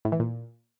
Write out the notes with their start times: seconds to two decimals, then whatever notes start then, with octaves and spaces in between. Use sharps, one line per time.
0.05 A2
0.12 E3
0.20 A#2